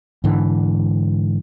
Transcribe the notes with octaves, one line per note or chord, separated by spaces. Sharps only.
G#2 D3 E3